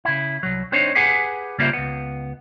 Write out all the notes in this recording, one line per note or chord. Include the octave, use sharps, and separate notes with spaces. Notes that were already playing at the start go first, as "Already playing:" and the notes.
C#3 E4
C2 F#3
C4 D4 D#4 C5 C#5
G4 G#4 B4 F#5 G#5
C#3 G3 A#3 F4 C5 E5
C#2 B3